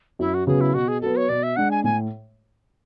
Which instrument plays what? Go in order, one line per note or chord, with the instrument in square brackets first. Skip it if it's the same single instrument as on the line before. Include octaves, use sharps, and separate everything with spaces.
[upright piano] F#2 [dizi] E4
[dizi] F#4
[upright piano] C#3 F#3 B3 [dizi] G#4
[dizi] E4
[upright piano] B2 [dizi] F#4
[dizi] G#4
[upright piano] F#3 B3 [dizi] A4
[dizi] C#5
[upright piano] B2 [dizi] D5
[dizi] E5
[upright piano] G#3 D4 [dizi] F#5
[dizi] G#5
[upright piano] A2 [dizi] G#5